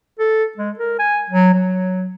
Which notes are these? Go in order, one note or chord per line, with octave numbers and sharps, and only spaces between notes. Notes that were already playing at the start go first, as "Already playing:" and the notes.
A4
G#3
A#4
G#5
F#3
F#3